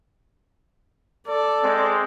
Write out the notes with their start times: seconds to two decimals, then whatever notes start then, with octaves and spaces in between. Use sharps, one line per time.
1.28 A4 D5
1.62 G#3 C4